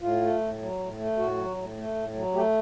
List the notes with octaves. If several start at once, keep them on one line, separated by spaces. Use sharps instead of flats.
A2 F4
A3
A2
F#3
A2
A3
A2 F#4
F#3
A2
A3
A2
F#3
A3 G4